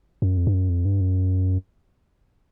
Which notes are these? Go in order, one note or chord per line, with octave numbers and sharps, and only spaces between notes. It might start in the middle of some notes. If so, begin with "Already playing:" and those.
F#2
F2
G2
F#2
F2
G2
F#2